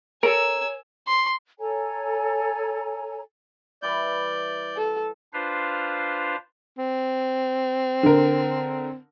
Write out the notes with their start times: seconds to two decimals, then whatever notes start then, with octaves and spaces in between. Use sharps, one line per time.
0.23 A4 A#4 C#5 G#5 A#5 E6 D7
1.07 C6
1.58 A4 C#5 G#5 A#5
3.82 E3 G3 E4 D5 G6
4.77 A4
5.33 D4 F4 B4 C5 F5
6.78 C4
8.03 D3 A#4